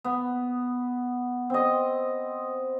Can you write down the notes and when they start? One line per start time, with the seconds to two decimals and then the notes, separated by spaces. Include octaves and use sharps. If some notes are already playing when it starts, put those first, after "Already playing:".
0.04 B3
1.50 C4 D#5